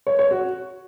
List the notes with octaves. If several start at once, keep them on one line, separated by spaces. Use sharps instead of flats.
C#5
C#5
F#4